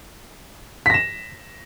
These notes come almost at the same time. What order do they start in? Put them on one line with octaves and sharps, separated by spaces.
B6 A#6 E7